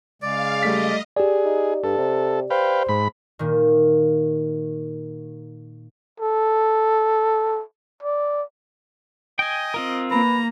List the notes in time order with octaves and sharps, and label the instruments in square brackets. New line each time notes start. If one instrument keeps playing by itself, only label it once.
[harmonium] C#3 G#3 [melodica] D5 [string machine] F5
[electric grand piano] G3 A3 B6 [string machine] D#5
[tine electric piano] G4 D5 [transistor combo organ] G#4
[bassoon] D#4
[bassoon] G2 [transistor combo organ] A4
[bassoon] C3
[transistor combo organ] B4 F5 G5 [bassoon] C5
[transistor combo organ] G#2 B5
[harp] A#2 D#3
[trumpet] A4
D5
[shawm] D#5 [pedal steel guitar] G5 G#5
[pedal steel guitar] C4 F4 A#4
[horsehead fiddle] A#3 [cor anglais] B4 [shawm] A#5